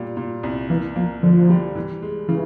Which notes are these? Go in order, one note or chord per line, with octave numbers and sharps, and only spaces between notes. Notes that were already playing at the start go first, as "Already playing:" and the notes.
Already playing: A#2 G3
A#2
C2
E3 A#3
F3 A#3
D3 F3
G3
E3
G#3
C#3 E3